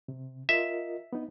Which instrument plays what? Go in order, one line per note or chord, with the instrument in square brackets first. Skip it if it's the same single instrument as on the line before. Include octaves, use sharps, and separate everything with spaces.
[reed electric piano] C3
[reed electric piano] F4 A#4 D#5 [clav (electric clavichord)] E5
[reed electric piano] B3 D#4